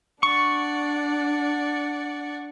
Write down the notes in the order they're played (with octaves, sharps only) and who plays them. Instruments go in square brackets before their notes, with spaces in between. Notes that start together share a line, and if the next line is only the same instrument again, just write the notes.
[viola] D4 [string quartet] D5 F#5 [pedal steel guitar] C#6